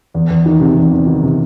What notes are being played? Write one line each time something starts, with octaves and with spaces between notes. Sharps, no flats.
E2
E2
D#3
C3
E2
E2
D#3
C3